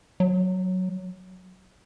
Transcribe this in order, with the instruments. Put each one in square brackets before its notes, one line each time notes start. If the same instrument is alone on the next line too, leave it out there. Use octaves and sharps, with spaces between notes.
[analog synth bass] F#3